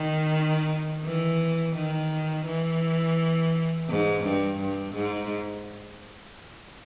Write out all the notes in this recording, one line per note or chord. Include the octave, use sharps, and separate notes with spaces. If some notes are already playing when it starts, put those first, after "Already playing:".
Already playing: D#3
E3
D#3
E3
G#2
G2
G2
G#2